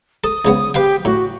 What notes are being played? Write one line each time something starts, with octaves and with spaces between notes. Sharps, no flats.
A4 D#6
C#2 C#3 B3
G4 B4 F5 G5
A2 F#4